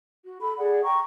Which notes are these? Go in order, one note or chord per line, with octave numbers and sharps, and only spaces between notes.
F#4
A4 B5
G#4 D5 F#5
G5 A#5 C#6